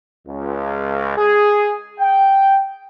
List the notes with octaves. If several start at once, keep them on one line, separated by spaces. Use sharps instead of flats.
C#2
G#4
G5